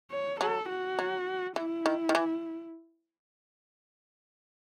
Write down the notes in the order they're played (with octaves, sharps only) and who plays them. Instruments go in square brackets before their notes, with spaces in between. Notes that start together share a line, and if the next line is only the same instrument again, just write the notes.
[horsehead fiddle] C#5
[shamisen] F#3 [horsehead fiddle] A4
[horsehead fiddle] F#4
[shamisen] F#3
[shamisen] E3 [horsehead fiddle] E4
[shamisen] D#3
D#3
E3